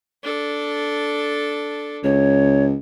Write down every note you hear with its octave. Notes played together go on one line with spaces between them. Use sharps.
D4 A4
C#2 C#5